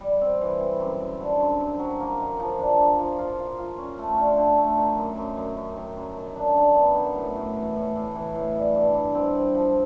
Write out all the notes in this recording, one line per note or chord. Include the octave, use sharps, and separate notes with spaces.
G3
C4
E3
C4
F#2
F#2
D3
F#2
C3
F#3
A#3
D#3
F3
D4
A#3
F3
F4
F4
F4
C#4
A3
D3
D3
A3
D#3
F#2
F#2
F#2
F#2
D#3
F#2
D#3
D4
D4
B3
D#3
A2
A2
E3
A2
A2
E3
A2
G3
G2
G2
C4
C4
F3